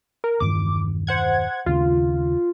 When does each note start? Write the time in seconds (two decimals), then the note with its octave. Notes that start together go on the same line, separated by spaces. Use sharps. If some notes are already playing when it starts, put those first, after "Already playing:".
0.24 A#4
0.40 E1 G2 D#3 D6
1.07 C5 F#5 G#6
1.66 D#2 C#3 F4